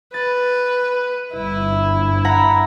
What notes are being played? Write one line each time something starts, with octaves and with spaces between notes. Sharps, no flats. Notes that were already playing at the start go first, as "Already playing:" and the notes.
B4 A6
G1 G2 E4
F#5 A#5 B5